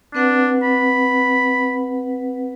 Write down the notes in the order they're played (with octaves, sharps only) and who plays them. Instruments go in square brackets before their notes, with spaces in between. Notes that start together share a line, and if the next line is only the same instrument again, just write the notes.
[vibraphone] C4 B4 F#5 [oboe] D4
[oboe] B5